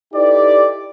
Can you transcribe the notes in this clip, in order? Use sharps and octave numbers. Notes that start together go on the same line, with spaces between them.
D#4 E4 G4 A4 B4 D5